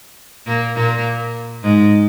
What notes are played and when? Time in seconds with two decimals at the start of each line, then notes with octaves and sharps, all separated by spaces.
0.46 A#2 A#3
0.76 A#2 A#3
1.63 G#2 G#3